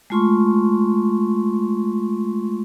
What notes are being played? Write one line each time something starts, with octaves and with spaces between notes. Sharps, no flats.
G#3 A3 F4 C6 C#6